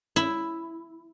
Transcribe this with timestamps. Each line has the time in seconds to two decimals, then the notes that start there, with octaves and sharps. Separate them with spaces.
0.16 E4